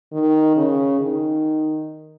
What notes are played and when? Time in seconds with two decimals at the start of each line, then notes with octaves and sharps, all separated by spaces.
0.12 D#3
0.56 C#3
1.00 D#3